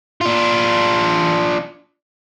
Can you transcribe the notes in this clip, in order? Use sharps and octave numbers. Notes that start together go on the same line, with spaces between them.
D4 F4